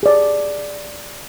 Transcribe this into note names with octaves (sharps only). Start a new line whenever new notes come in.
G#4 D5